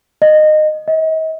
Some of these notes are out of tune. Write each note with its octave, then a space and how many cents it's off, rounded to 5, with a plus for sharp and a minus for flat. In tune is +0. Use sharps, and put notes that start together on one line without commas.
D#5 -20
D#5 +40